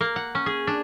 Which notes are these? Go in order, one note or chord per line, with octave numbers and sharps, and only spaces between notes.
A#3
F#5
C#4
G#4
D4